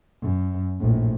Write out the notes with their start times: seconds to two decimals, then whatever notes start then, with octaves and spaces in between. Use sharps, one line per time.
0.21 F#2
0.80 A#1 A2